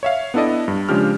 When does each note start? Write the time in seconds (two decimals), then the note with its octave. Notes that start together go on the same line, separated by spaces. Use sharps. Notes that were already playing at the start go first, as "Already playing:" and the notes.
0.03 C#5 E5 F5
0.34 B3 D4 E4 A4 D5 D#5
0.68 G2
0.89 C#3 F3 G#3 D4 G4 F6